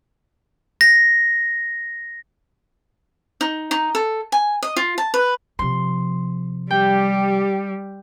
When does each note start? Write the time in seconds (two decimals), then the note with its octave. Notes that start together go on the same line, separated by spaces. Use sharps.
0.81 A#6
3.41 D#4
3.71 D#4
3.95 A4
4.32 G#5
4.63 D#5
4.76 F4
4.98 A5
5.14 B4
5.59 C3 F3 C6
6.71 G3 G4 G5